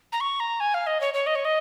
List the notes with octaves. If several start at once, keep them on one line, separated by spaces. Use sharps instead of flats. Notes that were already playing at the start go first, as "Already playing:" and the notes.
A#5
C#6
A#5
G#5
F5
D#5
C#5
C#5
D#5
C#5
D#5